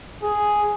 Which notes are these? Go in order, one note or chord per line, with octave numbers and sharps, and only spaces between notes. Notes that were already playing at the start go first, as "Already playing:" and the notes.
G#4